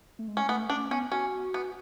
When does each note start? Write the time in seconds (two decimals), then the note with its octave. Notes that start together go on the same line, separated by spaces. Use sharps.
0.19 A3
0.28 G#3
0.37 C#4
0.49 A3 B3
0.70 C#4 D4
0.91 B3 C#4
1.11 C#4 F#4
1.54 B3